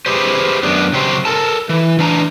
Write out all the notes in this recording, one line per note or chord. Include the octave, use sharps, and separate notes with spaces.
G4 G#4 B4 C5
F#2 B3 D4
C#3 F#3 G4 C5
A4 A#4 A5
E3
E3 D4 A5 A#5